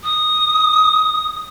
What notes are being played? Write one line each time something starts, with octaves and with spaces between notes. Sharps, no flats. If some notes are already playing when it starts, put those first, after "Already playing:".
D#6